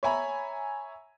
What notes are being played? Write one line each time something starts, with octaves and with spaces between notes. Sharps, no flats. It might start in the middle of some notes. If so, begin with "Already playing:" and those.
C#5 E5 G#5 A#5 B5